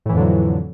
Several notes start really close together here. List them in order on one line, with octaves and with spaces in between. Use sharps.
A2 E3 F2 D3 F#3